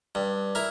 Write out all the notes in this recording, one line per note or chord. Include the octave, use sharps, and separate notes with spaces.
G2
E4 A#4